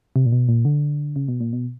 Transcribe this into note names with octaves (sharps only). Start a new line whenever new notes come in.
C3
A#2
B2
A#2
D3
C#3
B2
A#2
B2